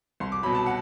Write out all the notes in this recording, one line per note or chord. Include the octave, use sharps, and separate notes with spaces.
C2 C6
D6
B2 F#3 B5
A5
F#5